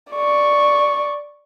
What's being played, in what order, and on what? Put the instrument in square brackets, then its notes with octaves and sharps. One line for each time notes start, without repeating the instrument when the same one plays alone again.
[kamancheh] D5 C#6